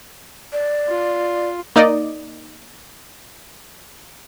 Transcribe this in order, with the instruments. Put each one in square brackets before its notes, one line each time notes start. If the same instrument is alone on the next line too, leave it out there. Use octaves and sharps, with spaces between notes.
[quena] D5
[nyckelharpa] F4
[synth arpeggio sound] A#3 D#4 D5 D#5